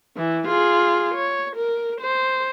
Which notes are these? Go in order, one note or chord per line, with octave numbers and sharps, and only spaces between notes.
E3
F4 G#4
C#5
A#4
C5